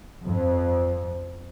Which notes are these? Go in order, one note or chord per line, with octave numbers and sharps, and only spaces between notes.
F2